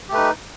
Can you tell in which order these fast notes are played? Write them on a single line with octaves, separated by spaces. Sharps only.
G4 A3 B4 D#4